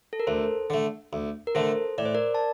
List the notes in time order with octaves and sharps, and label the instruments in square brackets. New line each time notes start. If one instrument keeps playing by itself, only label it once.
[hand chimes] A4
A#4
[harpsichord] D2 [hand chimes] A4 C5
[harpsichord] D3 A3
D2
[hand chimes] A#4
[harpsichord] D3 A3 [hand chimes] A4 C5
[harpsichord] A2 [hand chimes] D5
[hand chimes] C5
A#4 D5
A5